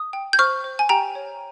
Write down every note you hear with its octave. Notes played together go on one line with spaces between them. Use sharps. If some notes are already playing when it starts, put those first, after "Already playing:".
Already playing: D#6
G5
G6
C5 C#6 F6
C5
G#5
G4 G5 A#5
C#5